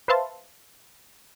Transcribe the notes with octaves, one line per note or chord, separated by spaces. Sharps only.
B4 C5 E5 F5 A5 C6